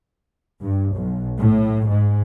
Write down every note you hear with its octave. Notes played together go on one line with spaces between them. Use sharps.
G2
B1
A2
G#2